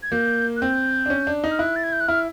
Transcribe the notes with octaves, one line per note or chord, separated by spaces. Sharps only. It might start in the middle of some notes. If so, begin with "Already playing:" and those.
G#6
A#3 G6
F#6
C4 G6
D4
C#4
D4
D#4
F6
E4 F#6
A6
G#6
G6
F#6
E4 F6